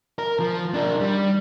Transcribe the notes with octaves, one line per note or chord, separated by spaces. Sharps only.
A#4
F3
D4 A#4
G3